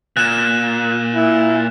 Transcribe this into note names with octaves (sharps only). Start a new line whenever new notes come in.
A#2 F#6 E7
E4